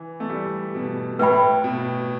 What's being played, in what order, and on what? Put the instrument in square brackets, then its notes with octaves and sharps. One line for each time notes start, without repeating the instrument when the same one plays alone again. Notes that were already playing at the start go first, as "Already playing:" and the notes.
Already playing: [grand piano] E3
A3
G3
B2
[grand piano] A2 [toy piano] B4 E5 G5 B5
[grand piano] B2